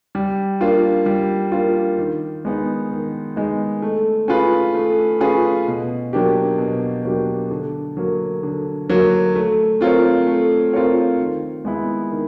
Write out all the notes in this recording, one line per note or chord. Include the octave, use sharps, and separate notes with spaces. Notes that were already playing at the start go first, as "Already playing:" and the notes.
G3
A#3 D4 F4
G3
A#3 D4 F4
D#3
G#3 B3 D#4
D#3
G#3 B3 D#4
A3
C#4 F4 G#4 B4
A3
C#4 F4 G#4 B4
B2
F#3 A#3 D4 G4
B2
F#3 A#3 D4 G4
D3
F#3 A#3
D3
F#3 A#3
A3
C4 F4 A#4 C#5
A3
C4 F4 A#4 C#5
D#3
G#3 B3 E4
D#3